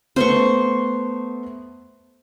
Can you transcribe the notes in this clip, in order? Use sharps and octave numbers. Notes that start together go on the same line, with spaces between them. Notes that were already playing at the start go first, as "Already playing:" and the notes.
A3 B3 C5 C6 C#6